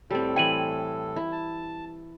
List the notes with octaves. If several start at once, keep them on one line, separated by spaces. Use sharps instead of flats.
A2 G3 C4 A4
E3 E4 G5 D#7 F#7
E4
A5